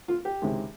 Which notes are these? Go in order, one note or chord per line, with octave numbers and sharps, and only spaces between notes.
F4
G4
C#2 C3 D#3 G#3